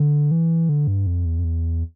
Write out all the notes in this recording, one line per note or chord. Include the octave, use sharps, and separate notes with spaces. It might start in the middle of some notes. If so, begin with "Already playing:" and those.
Already playing: D3
E3
D3
G2
F2
E2
F2
E2